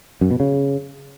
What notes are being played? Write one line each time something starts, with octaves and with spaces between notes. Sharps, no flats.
F#2
B2
C#3